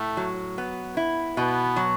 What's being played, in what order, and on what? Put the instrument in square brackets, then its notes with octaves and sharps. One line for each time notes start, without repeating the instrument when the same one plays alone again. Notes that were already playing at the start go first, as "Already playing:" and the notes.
Already playing: [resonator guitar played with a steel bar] A2 [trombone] A3
[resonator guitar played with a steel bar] F#3
B3
E4
[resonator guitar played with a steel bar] B2 [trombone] B3
[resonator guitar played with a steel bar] F#3